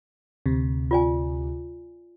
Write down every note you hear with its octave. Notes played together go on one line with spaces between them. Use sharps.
D2 C3
F4 D5 G#5